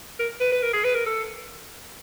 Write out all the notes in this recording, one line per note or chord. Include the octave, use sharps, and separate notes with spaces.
A#4
B4
B4
A#4
G#4
B4
A#4
A4